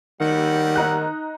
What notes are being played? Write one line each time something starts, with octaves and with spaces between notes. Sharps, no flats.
D#3 G3 F#5
D#4 A#5 F#6